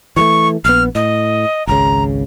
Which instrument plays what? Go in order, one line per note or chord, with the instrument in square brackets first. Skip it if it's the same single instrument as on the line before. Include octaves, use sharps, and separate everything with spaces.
[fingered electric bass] E3 G#3 A3 [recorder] C#6
[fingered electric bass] A#1 B3 [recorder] F6
[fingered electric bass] A2 [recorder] D#5
[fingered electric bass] G#1 C#2 C#3 [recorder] A#5